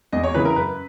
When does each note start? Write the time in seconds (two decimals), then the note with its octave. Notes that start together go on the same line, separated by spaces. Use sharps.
0.12 E2 D#5
0.24 C#5
0.34 C#3 E3 B4
0.45 A#4
0.56 F#2 B4